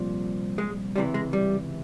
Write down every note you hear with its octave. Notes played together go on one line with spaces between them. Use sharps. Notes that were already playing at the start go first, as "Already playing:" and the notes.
Already playing: C2 A#2 F3
G#3
C#2 C3 E3 G3
G#3
G3